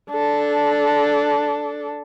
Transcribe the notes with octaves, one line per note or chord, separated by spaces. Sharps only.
D4 A4